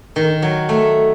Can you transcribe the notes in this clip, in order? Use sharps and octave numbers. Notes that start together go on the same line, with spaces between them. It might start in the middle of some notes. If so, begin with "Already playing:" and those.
D#3
F#3
A3